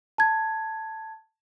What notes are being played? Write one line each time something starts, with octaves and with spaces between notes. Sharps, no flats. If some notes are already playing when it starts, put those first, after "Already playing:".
A5 G#6